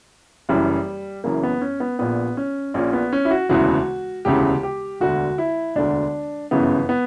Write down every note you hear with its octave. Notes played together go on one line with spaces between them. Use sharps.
F#1 F#2 E3 G3
F#1 F#2 E3 A#3
B3
C#4
B3
A#1 A#2 B3
C#4
A#1 A#2 C#4
B3
C#4
E4
F#4
E1 D2 C#3 E3 F#4
E1 D2 C#3 E3 G4
G4
E1 D2 D3 F#4
E4
E1 D2 D3 D4
G1 F#2 C#3 E3 B3
B3